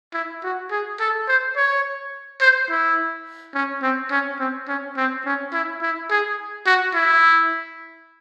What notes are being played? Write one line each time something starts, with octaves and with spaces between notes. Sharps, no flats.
E4
F#4
G#4
A4
C5
C#5
C5
E4
C#4
C4
C#4
C4
C#4
C4
C#4
E4
E4
G#4
F#4
E4